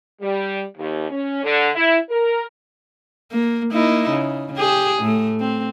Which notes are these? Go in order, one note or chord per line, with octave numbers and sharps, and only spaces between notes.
G3
D#2
C#4
D3
E4
A#4
A#3
A#3 D#4 E4
C#3
G4 G#4
A2 A3
C4